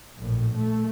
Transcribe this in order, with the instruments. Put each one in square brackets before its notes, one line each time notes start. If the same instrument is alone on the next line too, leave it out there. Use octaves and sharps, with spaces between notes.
[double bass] A#1 A2
A3